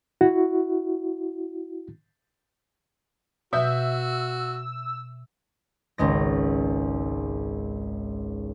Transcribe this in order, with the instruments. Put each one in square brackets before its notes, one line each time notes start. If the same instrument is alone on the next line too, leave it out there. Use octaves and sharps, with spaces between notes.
[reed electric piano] E4 F#4
[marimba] B2 [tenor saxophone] F#4 [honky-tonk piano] E5 G6 [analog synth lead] E6
[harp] G#1 C#2 G#3 A#6